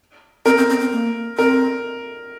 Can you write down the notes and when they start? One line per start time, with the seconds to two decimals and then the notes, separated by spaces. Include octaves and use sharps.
0.46 C4 A#4
0.57 C4
0.70 C4
0.80 C4
0.93 A#3
1.38 C4 A#4